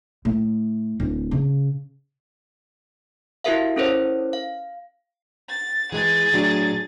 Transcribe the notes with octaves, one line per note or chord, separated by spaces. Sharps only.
A2
D1
C#3
E4 F#4 G4 A#4 E5 F5
C#4 E4 A4 A#4 C5 C#5
F5
A6
E3 G#3 G#4 A6
A2 F#3 D4